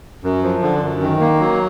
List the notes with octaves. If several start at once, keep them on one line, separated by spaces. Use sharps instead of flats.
F#2
F3
D3
F#2
D#3
A#3
F#3